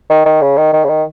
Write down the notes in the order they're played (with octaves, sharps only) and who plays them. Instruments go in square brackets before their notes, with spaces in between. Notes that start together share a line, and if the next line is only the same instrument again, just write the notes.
[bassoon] D#3
D#3
C#3
D#3
D#3
C#3
D#3